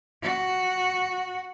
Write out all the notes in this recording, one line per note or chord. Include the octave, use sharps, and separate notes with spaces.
F#4